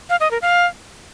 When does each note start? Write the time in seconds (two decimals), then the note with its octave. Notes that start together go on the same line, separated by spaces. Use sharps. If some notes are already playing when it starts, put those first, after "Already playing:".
0.10 F5
0.20 D#5
0.31 A#4
0.42 F5